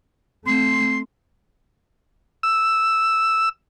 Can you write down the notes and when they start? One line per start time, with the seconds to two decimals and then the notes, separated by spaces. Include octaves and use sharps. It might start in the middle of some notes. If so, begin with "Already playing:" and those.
0.45 A3 C4 C6
2.43 E6